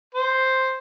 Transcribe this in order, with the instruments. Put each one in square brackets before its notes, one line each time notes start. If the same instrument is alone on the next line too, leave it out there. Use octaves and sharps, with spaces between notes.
[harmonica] C5